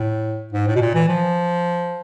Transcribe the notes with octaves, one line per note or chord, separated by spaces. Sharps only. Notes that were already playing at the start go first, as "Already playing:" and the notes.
Already playing: A2
G#2
A2
B2
A#2
E3
F3